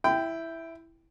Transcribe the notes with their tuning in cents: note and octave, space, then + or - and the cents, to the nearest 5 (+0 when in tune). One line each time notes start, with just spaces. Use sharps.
E4 +0 G5 +0 B5 +45